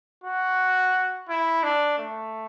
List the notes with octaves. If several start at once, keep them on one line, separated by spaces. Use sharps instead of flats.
F#4
E4
D4
A3